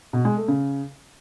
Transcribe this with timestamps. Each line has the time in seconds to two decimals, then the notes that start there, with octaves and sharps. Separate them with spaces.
0.13 B2
0.25 G#3
0.36 A3
0.48 C#3